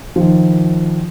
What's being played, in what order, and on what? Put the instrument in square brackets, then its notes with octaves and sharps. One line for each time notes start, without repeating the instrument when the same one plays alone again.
[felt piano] D#3 F3